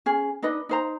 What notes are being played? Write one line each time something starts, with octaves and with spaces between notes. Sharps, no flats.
C#4 G#4
D4 D#4 B4 D#5
D#4 C5 A#5